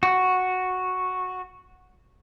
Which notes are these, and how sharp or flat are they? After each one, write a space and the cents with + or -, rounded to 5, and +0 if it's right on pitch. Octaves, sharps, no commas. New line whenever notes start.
F#4 -5